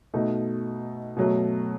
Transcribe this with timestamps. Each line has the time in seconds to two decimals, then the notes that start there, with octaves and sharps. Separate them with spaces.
0.14 B2 A3 D#4
1.17 B2 F#3 A3